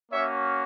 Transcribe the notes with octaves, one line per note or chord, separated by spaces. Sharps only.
A#3 C#4 F#4 C#5 E5